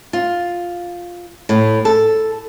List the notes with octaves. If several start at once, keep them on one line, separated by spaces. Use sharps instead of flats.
F4
A2
A4